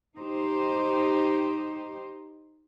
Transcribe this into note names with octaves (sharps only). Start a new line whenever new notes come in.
D#4 G4 C5